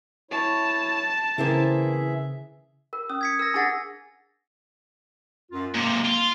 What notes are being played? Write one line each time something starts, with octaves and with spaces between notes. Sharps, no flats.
E4 C#5 A5
C#3 E3 A#3 C4 E4 G#4 E5
A#4
C#4 D#6
G#6 B6 C#7
A#4 E6 A#6
D4 G#4 F#5 G#5 A6 A#6
F#2 F4
G#2 C3 A#3
F4